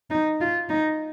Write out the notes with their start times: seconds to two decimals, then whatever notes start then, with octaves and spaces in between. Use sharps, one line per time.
0.10 D#4
0.41 F4
0.70 D#4